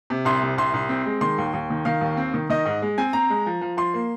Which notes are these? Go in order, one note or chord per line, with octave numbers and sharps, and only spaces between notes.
C3
C2 C6
C3
C2 C6
C2
C4
G#3
D#3 C6
D#2
D#2
D#3
D#3 F5
D#2
C4
D#3
D#3 D#5
G#2
G#3
C4 G#5
C4 A#5
G#3
F3
F3
F3 C6
A#3